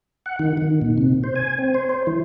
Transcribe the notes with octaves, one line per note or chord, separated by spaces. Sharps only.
F#5
D#3
D#3
A#2
C3
C5
G#5
C4
C5
C5
E3